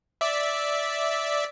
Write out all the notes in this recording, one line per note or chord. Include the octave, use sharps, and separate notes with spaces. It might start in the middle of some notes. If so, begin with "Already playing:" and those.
D5 E5